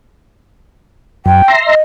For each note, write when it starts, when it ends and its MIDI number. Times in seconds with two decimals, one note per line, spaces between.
1.26 1.42 42
1.26 1.51 79
1.48 1.75 76
1.48 1.75 82
1.48 1.75 84
1.66 1.81 75